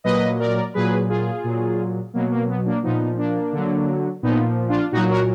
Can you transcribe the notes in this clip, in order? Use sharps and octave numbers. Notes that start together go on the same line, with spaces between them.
A#2 F#3 B4 D#5
A#4 D5
A#2 F#3 G#4 B4
F4 G#4
A#2 F#3
B2 F#3 A#3
A#3
B3
A#3 D4
A#2 F3 B3 D#4
A#3 D4
D3 F#3
A#2 F3 B3 D#4
D4 F4
A#2 F#3 D#4 F#4
F#4 A#4